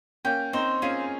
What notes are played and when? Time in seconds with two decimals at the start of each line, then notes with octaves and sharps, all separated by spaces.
0.25 A#3 C#4 G5
0.53 C4 D#4 C5
0.82 C#4 F4 G#4